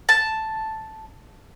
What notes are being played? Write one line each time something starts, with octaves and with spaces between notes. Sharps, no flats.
A5